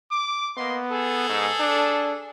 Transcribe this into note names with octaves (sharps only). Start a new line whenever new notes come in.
D6
A#3 B3 D#5 C6
G#4 A4
G#2
D4